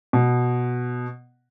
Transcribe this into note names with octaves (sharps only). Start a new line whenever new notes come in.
B2